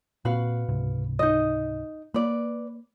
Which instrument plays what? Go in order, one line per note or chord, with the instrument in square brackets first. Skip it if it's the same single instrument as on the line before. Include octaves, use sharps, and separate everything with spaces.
[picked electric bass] A#2 C4 [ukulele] F#4 B4 F5
[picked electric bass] C#2 G#2 C3
[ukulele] D#4 D#5
[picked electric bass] A#3 [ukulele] B4 D5